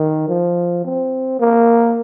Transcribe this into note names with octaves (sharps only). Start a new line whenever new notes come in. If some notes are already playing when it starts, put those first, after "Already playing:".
Already playing: D#3
F3
C4
A#3